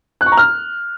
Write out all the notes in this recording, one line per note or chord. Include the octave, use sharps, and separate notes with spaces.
F#6
C#6
A#5
F6